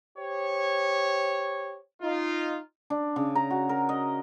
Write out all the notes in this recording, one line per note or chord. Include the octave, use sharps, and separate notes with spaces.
G4 C5 C#5
D#4 F4
D4
C#3
A#5
F#4
A#4
D#5